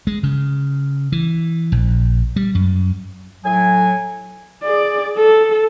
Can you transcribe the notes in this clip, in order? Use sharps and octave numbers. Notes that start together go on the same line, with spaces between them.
G#3
C#3
E3
A#1
G3
F#2
A2 F#3 G#5
G#4 D5
A4